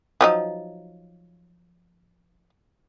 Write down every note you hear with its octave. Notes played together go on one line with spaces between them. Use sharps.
F3 F#3 D#4